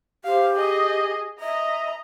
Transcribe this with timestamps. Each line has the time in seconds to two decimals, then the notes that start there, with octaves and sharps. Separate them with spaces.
0.25 G4 C5 F5
0.55 G#4 D#5
1.40 D#5 E5 A#5